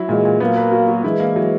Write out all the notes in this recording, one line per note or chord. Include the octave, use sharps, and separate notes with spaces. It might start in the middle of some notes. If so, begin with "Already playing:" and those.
Already playing: F#3 E4
A#2 E3 G#3
A#2
F#3 A#3 B3
B4
F#4
F#4
E3 G#3 E4
A#3
F#3